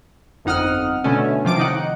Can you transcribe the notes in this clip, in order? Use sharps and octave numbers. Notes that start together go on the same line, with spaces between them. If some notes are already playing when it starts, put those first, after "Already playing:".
G1 F2 D#4 F#5 D#6 F6
B2 D3 A3 C#4
C3 F3 D6 D7
D#3 D#4 F#5